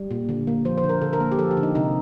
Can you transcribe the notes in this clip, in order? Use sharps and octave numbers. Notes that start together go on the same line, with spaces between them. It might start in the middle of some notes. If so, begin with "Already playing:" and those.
Already playing: G3
A#2
D3
A#3
F3 C5
C5
D3
A#4
D3 A4
A#4
A#3
G4
F3 A4
G4
D3
D#4
C3 D#4